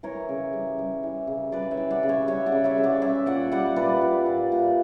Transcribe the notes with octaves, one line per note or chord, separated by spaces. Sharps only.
E3 A#4 C#5
C#3
G3
G3
E3
C#3
G3 B4 D5
C#5 E5
E3
D5 F#5
C#3
C#5 E5
G3 C#5 E5
D5 F#5
C#3
C#5 E5
C#3
D5 F#5
G3 C#5 E5
A#2 D5 F#5
G3 D5 F#5
A#2 B4 D5
A#2
A#2
A#2